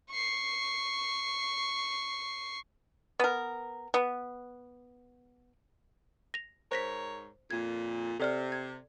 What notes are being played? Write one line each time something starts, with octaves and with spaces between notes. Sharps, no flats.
C#6 C7
B3 A#4
B3
A#6 F7
G#2 A#4 C5 C#5 A#6 B6
F2 A#2 G#6
C3 A4 D5 F6
G#6